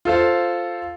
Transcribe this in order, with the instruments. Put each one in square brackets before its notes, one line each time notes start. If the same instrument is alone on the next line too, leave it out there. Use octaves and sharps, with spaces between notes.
[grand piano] F4 A4 C5 F5